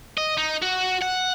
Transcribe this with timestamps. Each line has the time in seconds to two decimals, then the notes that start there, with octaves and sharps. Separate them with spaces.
0.17 D#5
0.38 D#4
0.62 F#4
1.02 F#5